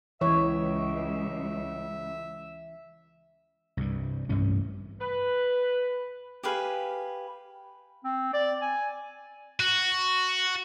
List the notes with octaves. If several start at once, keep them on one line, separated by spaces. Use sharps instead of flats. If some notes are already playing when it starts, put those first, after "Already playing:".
C#2 E3 C#5 E5
C2 G2
A1 G2 C3 C#4
B4
G4 G#4 B4 F5
C4
D5
G#5
F#4